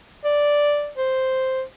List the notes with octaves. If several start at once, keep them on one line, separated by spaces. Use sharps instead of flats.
D5
C5